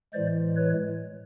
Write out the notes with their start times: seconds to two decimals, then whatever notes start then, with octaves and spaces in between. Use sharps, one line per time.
0.13 A2 E3 G#3 C5 D5
0.56 B4 C#5